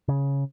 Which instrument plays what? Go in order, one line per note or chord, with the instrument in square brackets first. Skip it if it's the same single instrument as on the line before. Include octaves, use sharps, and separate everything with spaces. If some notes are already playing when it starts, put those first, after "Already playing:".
[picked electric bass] C#3